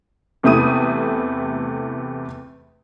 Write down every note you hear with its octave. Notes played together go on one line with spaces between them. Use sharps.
E2 C3 A3 E4 D#6 D#7